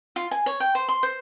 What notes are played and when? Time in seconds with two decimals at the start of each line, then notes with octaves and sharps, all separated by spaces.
0.16 F4
0.31 G#5
0.46 C#5
0.60 G5
0.75 C5
0.89 C6
1.03 C5